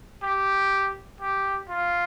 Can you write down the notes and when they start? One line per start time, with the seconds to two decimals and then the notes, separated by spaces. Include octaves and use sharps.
0.22 G4
1.21 G4
1.69 F4